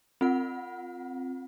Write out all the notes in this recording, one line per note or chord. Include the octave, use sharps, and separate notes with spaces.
C4 F4 F#5